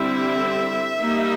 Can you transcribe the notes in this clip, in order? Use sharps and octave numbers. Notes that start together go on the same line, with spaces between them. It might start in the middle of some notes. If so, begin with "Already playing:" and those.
Already playing: D3 G3 C4 E4 E5
G3 A#3 D#4